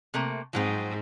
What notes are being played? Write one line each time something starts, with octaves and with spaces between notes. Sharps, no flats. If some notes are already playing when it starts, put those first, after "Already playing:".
C3 A3 A#3
G#2 F3 F#3 C4